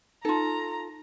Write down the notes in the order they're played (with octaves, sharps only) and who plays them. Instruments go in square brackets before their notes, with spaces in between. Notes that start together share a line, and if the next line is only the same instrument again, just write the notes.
[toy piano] D#4 [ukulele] F4 A4 [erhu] A#5